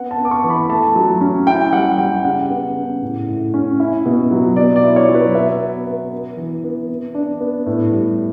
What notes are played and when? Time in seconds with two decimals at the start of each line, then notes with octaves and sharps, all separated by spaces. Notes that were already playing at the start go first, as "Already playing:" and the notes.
Already playing: B3 C#4 F#5
0.11 A5
0.18 B3
0.25 D6
0.31 C#6
0.44 E3
0.50 B5
0.69 A3 A5
0.96 F#3
1.21 C#4
1.47 E4 G5
1.73 G3 F#5
1.98 G3 G5
2.25 C#3 F#5
2.50 B3
2.76 C#3
3.02 A2
3.28 A2
3.54 C#4
3.80 E4 E5
4.06 B2
4.31 F#3
4.56 B2 D5
4.76 D5
4.82 E4
4.96 C#5
5.09 F#3
5.14 B4
5.35 B3 E5
5.60 B3
5.87 B3
6.12 B3
6.37 E3
6.64 B3
6.89 B3
7.15 D4
7.40 B3
7.66 A2
7.92 G3